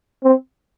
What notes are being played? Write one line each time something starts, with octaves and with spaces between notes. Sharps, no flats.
C4